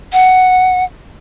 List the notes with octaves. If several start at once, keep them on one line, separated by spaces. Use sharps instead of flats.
F#5